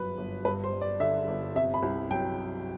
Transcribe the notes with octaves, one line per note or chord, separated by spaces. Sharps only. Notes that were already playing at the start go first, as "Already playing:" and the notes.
Already playing: G1 F#2 F#3 B4
G1
G2 B4
C5
G3
D5
D3 E5
G1
C3 E5
B5
C2
F#3 G5